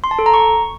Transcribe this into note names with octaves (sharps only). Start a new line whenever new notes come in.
C6
A5
A4
A#5
C#6